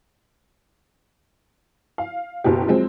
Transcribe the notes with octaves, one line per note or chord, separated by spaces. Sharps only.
F5
F#1 B2 G4
F3 F#3 G#3 C4